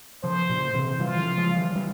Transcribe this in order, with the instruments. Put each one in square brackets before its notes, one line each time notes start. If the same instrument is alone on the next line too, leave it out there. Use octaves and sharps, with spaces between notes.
[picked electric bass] C#3 F3 [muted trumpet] C5
[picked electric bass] A#2 C#3
C3 E3
[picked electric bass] E3 G3 [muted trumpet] F4
[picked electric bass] C#3 F3
F3 G#3
E3 G3
E3 G3